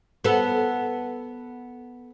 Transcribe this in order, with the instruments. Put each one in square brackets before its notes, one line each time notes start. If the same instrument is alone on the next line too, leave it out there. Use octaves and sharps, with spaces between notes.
[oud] B3 A4